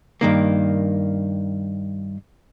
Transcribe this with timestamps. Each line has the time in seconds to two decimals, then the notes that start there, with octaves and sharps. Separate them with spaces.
0.21 G2 D#3 A#3